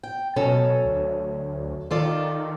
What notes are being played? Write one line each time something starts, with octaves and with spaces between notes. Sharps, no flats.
G5
B2 F#3 C#4 A4
D2
D#3 F4 A4 D5